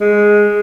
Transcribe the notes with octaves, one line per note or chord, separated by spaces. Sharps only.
G#3